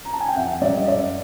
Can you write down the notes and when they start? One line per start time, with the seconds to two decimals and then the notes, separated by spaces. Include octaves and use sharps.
0.05 A#5
0.14 A5
0.20 G#5
0.28 G5
0.36 F2 E5 F#5
0.61 G3 D5 E5
0.77 D#5
0.87 F#2 D5 E5